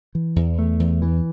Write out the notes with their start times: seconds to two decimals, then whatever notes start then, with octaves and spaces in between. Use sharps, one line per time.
0.15 E3
0.36 E2
0.59 A3
0.80 E2
1.02 E3